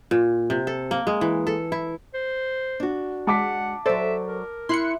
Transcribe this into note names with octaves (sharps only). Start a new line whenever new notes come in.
A#2
C3
A4
A#3
G#3
E3
A4
E4
C5
D4 F#4
G#3 F#5 A5 D6 B6
F#3 A4 C5 D5 E5
A#4
E4 C6 F#6 C#7